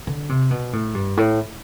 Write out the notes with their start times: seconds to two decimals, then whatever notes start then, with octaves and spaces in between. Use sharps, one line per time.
0.07 D3
0.29 C3
0.51 B2
0.73 A2
0.95 G2
1.17 A2